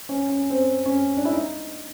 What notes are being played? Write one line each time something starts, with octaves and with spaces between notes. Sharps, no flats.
C#4
C#4
C4
C#4
D4
E4
D#4